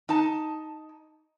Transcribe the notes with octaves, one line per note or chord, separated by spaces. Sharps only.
D#4 A5